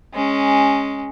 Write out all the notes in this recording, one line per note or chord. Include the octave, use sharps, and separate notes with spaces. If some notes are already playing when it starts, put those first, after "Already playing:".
G#3 C#4